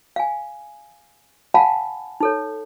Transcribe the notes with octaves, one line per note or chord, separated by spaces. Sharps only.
F5 G#5
F5 F#5 G#5 A5 B5
D#4 A4 C#5